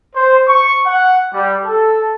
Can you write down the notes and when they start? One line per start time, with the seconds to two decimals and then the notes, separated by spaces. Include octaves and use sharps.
0.15 C5
0.48 C#6
0.86 F#5
1.33 G3
1.65 A4